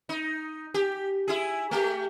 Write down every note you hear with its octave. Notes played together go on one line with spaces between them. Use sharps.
D#4
G4
E4 G#4
A3 G4